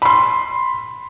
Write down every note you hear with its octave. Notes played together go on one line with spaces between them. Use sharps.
B5 C6